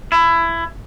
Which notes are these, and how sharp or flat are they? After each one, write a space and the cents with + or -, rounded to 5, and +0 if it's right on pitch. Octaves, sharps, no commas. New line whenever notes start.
E4 +20